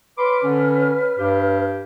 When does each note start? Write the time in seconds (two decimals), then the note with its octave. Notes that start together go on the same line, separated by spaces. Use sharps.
0.18 B4 C#5 B5 C6 D6 F6
0.44 D3 C#4
1.19 G2 G4